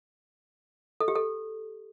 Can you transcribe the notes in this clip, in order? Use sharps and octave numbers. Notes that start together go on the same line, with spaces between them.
A4
G4
A4